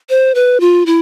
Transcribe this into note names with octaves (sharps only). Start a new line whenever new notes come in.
C5
B4
F4
E4